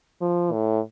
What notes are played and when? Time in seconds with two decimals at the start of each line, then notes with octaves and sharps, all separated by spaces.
0.22 F3
0.53 A2